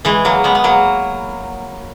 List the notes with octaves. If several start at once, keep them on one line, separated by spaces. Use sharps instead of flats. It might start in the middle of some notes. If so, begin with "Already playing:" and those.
E3 G#3
F#3 A#3
G#3 B3
B3
F#3 A#3